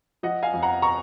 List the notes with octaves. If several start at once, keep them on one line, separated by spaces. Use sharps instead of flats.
F3 D#5 F#5
F5 G#5
F2
F#5 A#5
A#5 C#6